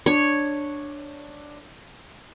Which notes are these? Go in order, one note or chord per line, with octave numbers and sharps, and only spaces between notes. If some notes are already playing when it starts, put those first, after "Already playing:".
D4 C#5